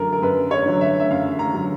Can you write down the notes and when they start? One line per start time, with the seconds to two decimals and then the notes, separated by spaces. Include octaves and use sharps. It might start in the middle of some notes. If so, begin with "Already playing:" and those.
Already playing: F#2 D3 F#3 A4 A#4
0.13 A#4
0.22 F#2 B4
0.51 C#5
0.66 D3 F#3
0.81 E5
1.00 E5
1.10 F#2 F5
1.39 A#5
1.53 D3 F#3